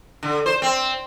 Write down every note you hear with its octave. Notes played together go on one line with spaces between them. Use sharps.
D3
C5
C4